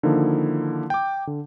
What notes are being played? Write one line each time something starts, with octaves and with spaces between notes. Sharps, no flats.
D3 D#3 F3 A#3 D#4 E4
G5 D6
D3